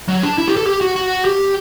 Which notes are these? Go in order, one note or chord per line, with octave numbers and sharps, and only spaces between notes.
F#3
D4
E4
G4
A4
G4
F#4
F#4
G4